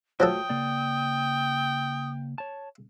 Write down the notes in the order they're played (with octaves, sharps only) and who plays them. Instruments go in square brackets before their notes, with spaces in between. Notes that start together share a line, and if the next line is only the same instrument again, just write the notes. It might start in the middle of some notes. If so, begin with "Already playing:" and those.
[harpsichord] F3 F#3 A4 [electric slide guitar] A3 F#4 [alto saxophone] G5 [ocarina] D#6
[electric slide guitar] C#3 A#3 D5
C#5 A5